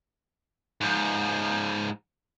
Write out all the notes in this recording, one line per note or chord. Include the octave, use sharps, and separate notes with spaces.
G#2 F3